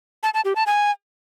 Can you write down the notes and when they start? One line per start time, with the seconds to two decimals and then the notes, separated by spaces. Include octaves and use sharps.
0.23 A5
0.34 A5
0.45 G4
0.56 A5
0.66 G#5